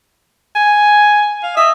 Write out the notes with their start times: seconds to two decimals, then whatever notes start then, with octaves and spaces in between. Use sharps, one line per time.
0.56 G#5
1.43 F5
1.57 D#5 E5